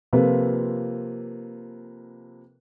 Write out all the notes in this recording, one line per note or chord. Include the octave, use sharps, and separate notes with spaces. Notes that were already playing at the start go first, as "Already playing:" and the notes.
C3 F3 A#3 F4 A4 B4